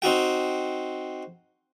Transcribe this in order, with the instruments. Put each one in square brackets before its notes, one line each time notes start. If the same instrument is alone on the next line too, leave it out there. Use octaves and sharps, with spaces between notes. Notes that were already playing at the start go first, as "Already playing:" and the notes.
[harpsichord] C4 D#4 F#4 G5